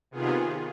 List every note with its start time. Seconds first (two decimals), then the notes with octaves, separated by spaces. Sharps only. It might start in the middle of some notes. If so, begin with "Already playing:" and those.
0.11 C3 D#3 B3 F4 G#4